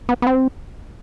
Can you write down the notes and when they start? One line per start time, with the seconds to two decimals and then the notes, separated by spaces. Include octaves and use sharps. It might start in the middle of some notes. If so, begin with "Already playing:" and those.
0.09 B3
0.22 B3
0.27 C4